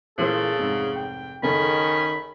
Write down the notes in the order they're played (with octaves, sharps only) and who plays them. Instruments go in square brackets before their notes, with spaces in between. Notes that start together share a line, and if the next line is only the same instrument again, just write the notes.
[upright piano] A#2 E3 C5 [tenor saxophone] C#3 [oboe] A4
[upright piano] F1 G#2
[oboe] G5
[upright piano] F#1 A4 [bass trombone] D#3 [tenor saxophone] C#4 [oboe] B5